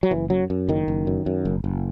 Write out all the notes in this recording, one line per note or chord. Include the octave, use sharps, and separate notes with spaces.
F#3
F#1 E3
F#2 F#3
F#2
F#1 D#3
F#1
F#2
F#2
F#1
F#1